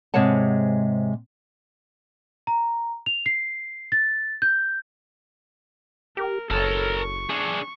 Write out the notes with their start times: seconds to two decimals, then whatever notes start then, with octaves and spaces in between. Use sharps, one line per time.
0.14 G#2 C3 G#3 C#5 F#5 A5
2.47 A#5
3.06 F7
3.26 C7
3.92 A6
4.42 G6
6.17 G4 A#4
6.50 F#1 A4 A#4 C#5 A5
6.99 C#6
7.30 D4 G#4